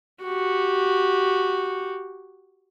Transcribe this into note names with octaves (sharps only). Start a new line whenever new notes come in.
F#4 G4